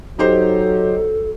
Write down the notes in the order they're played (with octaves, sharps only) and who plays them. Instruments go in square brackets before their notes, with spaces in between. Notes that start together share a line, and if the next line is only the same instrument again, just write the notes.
[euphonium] F#3 [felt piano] D#4 G4 C5 [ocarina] A4